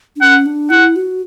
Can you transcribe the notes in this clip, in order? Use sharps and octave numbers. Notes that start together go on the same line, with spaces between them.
D4
C#4 F#5
D4
E4 F#5
F#4